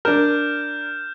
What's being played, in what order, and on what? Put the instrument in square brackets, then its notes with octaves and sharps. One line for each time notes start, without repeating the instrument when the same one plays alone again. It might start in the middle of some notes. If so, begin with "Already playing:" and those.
[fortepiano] D4 A#4 [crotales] F6 G6 E7